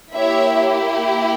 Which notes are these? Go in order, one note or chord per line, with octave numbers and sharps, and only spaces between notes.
A#3 E4 G4 C#5 E5